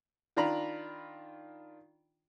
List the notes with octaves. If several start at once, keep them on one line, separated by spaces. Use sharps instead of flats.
D#3 D4 F4 A#5 B5